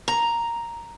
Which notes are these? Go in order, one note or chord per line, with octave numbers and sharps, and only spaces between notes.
A#5